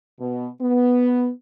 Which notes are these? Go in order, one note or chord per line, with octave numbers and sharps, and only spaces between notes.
B2
B3